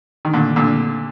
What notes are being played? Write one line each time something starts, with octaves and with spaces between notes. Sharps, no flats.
D#3
A#2 D3
A#2 D3